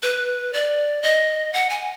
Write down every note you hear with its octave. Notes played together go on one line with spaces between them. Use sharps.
B4
D5
D#5
F#5
G#5